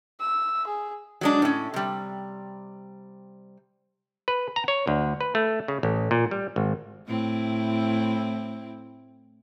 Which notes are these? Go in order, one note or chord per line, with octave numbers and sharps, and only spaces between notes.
E6
G#4
F#3 G#3 D4
A2 C#4
C3 G3
B4
A#5
C#5
D2
B4
A3
C#3
A1
A#2
G3
G#1
A2 C4 E4